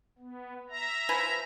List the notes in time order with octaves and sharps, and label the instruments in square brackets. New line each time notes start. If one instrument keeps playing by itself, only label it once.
[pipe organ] B3
E5 A#5
[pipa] F3 B4 G#5